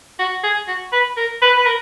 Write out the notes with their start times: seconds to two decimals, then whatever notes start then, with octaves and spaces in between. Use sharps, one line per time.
0.19 F#4
0.43 G#4
0.68 F#4
0.93 B4
1.17 A#4
1.42 B4
1.57 B4
1.66 A#4